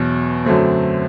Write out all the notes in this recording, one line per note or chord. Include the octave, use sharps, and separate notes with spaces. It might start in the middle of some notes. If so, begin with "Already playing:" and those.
Already playing: E2 B2 F#3
F#2 D3 F#3 A3 C4